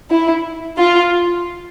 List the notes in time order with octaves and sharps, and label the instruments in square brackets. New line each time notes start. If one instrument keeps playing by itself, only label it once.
[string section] E4
F4